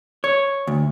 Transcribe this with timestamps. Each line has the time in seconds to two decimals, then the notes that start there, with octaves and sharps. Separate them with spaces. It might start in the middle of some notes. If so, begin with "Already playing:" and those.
0.24 C#5
0.67 D2